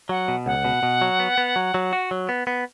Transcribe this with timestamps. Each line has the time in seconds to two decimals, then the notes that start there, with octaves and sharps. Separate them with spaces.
0.09 F#3 F#5
0.28 B2
0.46 C#2 F#5
0.64 B2
0.83 B2
1.01 F#3
1.20 B3
1.38 B3
1.56 F#3
1.74 F#3
1.93 F#4
2.11 F#3
2.29 B3
2.47 B3